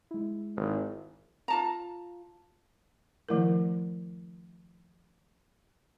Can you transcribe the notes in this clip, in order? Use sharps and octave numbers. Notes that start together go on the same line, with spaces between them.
G#3 E4
G#1
F4 A5 A#5
D#3 F3 A3 E4 A#4